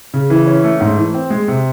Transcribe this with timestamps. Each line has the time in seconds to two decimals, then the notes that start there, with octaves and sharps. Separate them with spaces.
0.14 C#3
0.30 E3
0.47 C#4
0.64 A3
0.81 G#2
0.97 E3
1.14 C4
1.30 G#3
1.48 C3